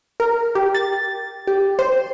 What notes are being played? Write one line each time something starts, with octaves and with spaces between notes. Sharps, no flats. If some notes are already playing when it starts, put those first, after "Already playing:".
A#4
G4
A6
G4
C5